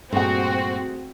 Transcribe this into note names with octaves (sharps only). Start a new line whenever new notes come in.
G2 A#2 A3 C4 F#4 G#4 F#5